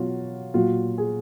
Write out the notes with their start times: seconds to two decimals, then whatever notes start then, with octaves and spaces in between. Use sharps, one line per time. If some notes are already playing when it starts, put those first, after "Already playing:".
Already playing: B2 F#3 F4
0.54 A#2 F#3 F4
0.98 G#4